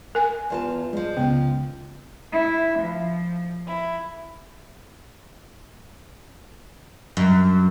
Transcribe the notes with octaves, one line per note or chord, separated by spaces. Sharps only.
A#4 G#5
E2 F4 A5
F2 F3 G#3
C#2 C#3 B3
E4
F3
E4
F#2